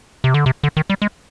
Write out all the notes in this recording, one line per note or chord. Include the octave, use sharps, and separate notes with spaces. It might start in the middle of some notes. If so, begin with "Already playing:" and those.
C3
D3
C3
D3
D#3
G3
G#3